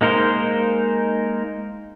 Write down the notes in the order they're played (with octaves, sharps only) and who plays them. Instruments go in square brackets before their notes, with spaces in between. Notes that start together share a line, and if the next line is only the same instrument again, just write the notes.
[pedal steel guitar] G#3 A#3 D#4 A#4 C5